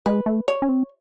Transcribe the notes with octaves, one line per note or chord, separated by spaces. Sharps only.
G#3 B4
A3
C#5
C#4
C4